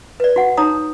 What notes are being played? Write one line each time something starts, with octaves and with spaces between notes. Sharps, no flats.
B4 D5
F#4 F#5
D#4 C#5 A#5 D#6